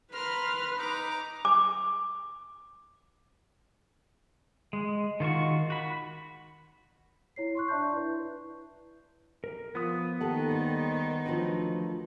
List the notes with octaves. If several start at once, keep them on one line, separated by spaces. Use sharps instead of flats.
A#4 B4 C6 F6
D#4 A#5 D6
D6
G#3
D#3 F4 F#4 C#6
F#4 B5
E4 C#5 C7
C6 C#6 F#6
D4 D5 E5 A5 C#6 G6
E4 B4
A#4
F3 B3 D#6
D#2 D#3 D#4 G4 A4 F#5
G3 C5
D2 F3 F#3 B4